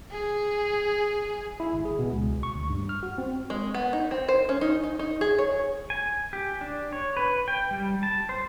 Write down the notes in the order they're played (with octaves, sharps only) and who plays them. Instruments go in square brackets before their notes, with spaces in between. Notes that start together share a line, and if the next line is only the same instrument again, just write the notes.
[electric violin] G#4
[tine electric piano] E4
G#1
G#4
B2
C#2
B1
C#6
D2
G2
F6
F#4
C4
[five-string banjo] G#3
B3
D#4
C4
C5
C#4
D#4
D#4
D#4
G#4
C#5
[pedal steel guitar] G#5
G4
D4
C#5
B4
G5
G3
A5
C5